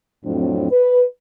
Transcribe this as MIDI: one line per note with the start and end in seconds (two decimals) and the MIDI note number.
0.24 0.71 41
0.24 0.71 45
0.24 0.71 54
0.24 0.71 60
0.24 0.71 62
0.71 1.03 71